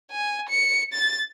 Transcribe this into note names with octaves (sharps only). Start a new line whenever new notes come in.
G#5
C#7
A6